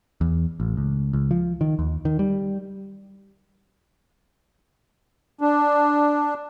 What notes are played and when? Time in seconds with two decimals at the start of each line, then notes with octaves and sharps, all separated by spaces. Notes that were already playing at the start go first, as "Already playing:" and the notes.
0.21 E2
0.60 A1
0.77 C#2
1.13 C#2
1.31 F3
1.61 D#3
1.79 D#2
2.05 D#3
2.19 G3
5.41 D4